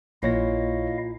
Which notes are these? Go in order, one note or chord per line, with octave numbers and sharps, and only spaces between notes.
A#1 A#2 E4 C#5 D#5 F5 A#6